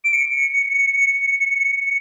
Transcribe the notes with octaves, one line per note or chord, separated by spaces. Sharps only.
D7
C#7